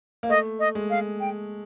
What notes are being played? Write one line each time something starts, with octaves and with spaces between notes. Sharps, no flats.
A#3
A3 D#5
D#5
G#3
F5
G5